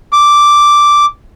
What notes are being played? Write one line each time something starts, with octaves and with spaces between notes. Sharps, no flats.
D6